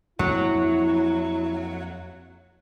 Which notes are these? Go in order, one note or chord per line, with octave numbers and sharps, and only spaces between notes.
F2 F#3 A#3 C4 E4